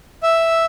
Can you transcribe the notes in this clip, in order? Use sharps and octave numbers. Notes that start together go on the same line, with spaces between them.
E5